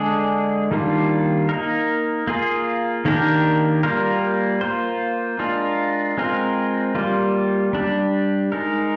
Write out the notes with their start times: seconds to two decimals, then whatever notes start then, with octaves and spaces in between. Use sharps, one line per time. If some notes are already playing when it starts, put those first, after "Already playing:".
Already playing: D3 G#3 D4 G#4
0.71 D#3 G3 A#3 D4 F4
1.49 A#3 D#4 A#4
2.27 A#3 F4 G#4
3.05 D#3 A#3 D4 G4 A#4
3.83 G3 A#3 F4 A#4
4.61 A#3 F4 C5
5.39 G#3 D4 F4 A#4
6.18 G#3 C4 F4 A#4
6.95 G3 A#3 F4
7.73 G3 D4 G4
8.52 G#3 D#4 A#4